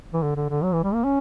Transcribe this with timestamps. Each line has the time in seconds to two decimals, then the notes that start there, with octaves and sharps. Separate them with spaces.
0.13 E3
0.23 D3
0.36 D3
0.50 D3
0.63 F#3
0.73 E3
0.83 G3
0.94 A#3
1.04 C#4